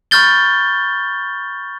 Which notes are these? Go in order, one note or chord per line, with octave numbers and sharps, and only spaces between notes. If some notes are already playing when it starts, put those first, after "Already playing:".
B5 C#6 F6 G6 A6 G7